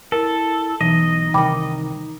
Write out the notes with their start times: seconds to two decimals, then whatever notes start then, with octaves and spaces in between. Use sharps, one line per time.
0.12 E4 A4 A#4
0.81 B1 E3 D#4 D#5
1.34 C2 D#3 G5 B5 D6